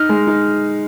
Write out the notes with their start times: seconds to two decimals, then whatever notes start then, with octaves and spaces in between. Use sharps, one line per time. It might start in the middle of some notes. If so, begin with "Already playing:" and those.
Already playing: D#4 F6
0.09 G#3
0.27 D#4